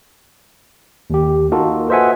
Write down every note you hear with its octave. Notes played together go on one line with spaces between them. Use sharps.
D#2 G4
A#3 D#4 F4 F#4 A4 A#4
B4 C5 D#5 E5 F#5 G#5